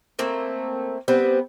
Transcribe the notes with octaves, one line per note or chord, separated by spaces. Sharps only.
A3 A#3 C4
G3 B3 C4